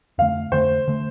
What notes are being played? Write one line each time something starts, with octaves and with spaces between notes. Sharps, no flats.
F2 D3 A3 F5
F2 D3 A3 C5
D3 A3